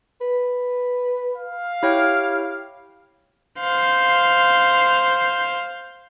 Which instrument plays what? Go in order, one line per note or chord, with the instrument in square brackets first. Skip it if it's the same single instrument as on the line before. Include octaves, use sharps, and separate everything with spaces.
[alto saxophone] B4
[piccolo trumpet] F5
[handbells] E4 C#5 G5 [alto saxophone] G4
[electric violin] C5 F5